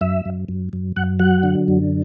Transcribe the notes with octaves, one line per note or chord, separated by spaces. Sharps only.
F#2 E5
F#2
F#2
F#2
F#2 F#5
F#3 F#5
D3
F#2